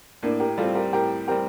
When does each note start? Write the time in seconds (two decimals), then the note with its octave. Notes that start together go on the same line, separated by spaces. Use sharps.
0.23 A2 A#3 D4
0.40 G4 A#4
0.58 G3 C4 F4 A4
0.75 G4 A#4
0.93 A2 G4 A#4
1.28 G3 C4 G4 A#4